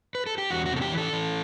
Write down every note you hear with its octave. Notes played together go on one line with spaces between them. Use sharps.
B4
A4
G4
E2 F#4
F#4
C3
A4
G4
E3
A4
E3